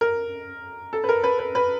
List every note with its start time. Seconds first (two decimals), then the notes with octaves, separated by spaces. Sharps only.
0.01 A#4
0.93 A4
1.04 B4
1.09 A#4
1.24 B4
1.39 B4
1.55 B4